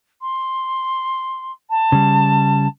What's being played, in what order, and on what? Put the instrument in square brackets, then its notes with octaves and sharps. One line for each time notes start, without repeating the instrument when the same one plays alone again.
[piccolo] C6
A5
[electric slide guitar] C#3 G3